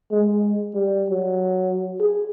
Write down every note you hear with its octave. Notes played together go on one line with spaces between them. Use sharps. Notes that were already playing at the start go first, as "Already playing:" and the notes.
G#3
G3
F#3
G#4